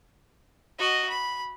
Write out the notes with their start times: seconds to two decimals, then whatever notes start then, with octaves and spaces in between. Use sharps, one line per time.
0.79 F#4 D#5
1.09 B5